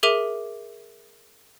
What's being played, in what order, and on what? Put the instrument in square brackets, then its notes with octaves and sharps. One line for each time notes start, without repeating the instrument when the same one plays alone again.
[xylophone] G#4 A#4 E5 D6 D#7 F7